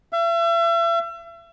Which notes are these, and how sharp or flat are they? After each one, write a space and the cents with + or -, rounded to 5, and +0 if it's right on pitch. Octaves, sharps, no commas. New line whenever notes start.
E5 +40